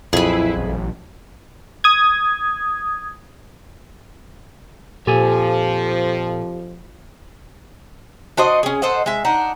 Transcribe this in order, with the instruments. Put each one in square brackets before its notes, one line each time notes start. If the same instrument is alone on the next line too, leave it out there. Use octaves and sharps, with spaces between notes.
[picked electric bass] B1 A#2 F#3 [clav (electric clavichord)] F2 [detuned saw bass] E4 [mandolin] G#4 B4
[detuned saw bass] A1
[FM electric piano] D#6 G#6
[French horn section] F2 F3 [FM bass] A#2 [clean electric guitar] G4 A4 G#5
[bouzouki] D4 F#4 C5 D#5
C#4 G#4
A4 C5 D#5 F#5
G#3 E5
D4 D#4 F#5